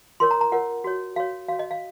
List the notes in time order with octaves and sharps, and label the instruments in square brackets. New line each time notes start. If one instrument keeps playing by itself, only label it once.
[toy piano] F4 A#4 C#5 C6
A#5
A#5
F4 A#4 C#5 F#5
F#4 C#5
F#4 C#5 F5
F#4 C#5 F5
D#5
F5